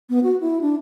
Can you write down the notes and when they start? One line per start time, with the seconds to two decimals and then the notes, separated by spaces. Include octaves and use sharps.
0.10 B3
0.23 F#4
0.41 E4
0.61 D4